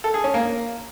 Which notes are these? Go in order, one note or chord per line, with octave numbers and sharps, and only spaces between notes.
A4
G#4
C#4
A#3